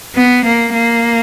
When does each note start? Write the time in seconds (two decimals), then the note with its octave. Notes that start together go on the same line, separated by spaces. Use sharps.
0.16 B3
0.45 A#3
0.74 A#3